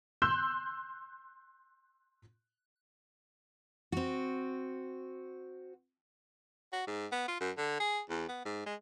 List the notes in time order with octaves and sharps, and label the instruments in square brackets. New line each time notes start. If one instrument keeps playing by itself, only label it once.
[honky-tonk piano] C6 E6 F#6 G6 E7
[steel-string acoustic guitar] C4 F#4
[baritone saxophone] F#4
G#2
B3
F4
F#2
D3
G#4
E2
B3
G#2
G#3